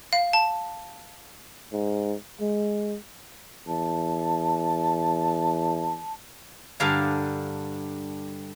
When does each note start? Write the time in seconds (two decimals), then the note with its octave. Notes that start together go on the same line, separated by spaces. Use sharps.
0.13 F5
0.33 A5
1.72 G#2
2.40 G#3
3.67 E2 A5
6.80 G2 D3 A4 A#4 F5 G#5